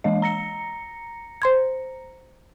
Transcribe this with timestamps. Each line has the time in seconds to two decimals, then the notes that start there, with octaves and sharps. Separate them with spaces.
0.04 E3 G#3 D#5
0.22 A#5 A#6 C#7
1.42 C5 C6 G#6